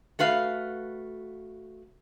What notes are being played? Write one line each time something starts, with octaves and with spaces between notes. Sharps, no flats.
A3 F#4 B4 F5